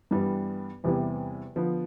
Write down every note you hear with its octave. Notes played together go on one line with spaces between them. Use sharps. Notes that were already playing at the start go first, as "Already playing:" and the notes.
G2 E3 G3 B3
E2 C3 G3 B3 E4
D3 F3 B3